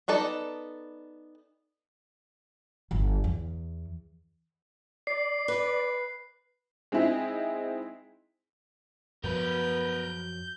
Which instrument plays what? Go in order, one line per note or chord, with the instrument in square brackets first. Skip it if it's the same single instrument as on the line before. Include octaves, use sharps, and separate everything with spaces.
[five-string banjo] B3 D#4 A4 D5
[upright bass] G1
E2
[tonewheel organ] D5 [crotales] C7
[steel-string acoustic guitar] B4
[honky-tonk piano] G#3 C4 D#4 E4 G#4
[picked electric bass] F#2 F3 F#3 [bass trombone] B3 [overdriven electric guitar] A#4 B4 [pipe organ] G6